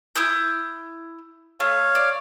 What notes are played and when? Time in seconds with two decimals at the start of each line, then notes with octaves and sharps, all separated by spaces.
0.16 E4 D#6 G6
1.60 A3 C#5 F5
1.95 D5